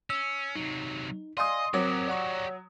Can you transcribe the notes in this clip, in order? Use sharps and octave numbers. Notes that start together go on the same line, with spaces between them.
C#4 E6
C3 F#3 D#4
D5 D#5 F5 G#5 C6 D#6
F#3 C4 F#4 G4 A#4 D6
D5 F#5 C#6